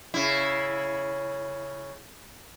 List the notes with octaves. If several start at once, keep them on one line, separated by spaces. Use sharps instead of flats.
C#3 E4